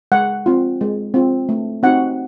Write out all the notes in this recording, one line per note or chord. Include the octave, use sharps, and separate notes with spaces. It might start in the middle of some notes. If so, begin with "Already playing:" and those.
G#3 F#5
C4 F4
G#3
C4 F4
A3
C4 D#4 F#4 F#5